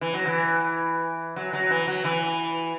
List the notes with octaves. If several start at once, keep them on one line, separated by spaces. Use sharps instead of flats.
E3
F#3
E3
F#3
F#3
E3
F#3
E3